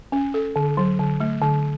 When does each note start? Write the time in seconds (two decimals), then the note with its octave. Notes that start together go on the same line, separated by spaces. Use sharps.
0.12 C#4
0.34 A4
0.56 D3
0.77 F#3
0.99 D3
1.20 A3
1.42 D3